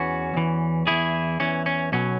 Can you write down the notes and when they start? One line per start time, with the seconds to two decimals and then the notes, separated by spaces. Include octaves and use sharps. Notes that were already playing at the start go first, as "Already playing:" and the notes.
Already playing: E2 E3 C#4 F#4
0.34 E2 E3
0.87 E2 E3 E4 G#4
1.40 E2 E3 C#4
1.66 C#4
1.92 B1 B2 F#3 C#4